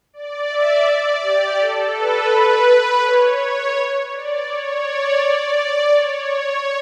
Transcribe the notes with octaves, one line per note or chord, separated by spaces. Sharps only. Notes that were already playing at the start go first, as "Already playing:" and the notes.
D5
E5
D5
G4
A4
B4
C#5
D5
C#5
D5
D5
D5
C#5
C#5